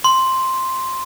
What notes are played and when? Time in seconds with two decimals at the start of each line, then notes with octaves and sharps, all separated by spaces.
0.04 C6